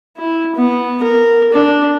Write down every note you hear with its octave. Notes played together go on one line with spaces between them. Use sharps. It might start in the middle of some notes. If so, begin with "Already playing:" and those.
E4
B3
A#4
D4